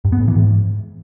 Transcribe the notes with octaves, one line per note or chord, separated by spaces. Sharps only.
G2
B3
G#2
E3
G#2